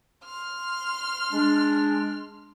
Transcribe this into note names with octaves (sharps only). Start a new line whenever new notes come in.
C6 F6
G#3 D4